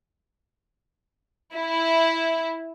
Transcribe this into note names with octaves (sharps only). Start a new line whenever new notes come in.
E4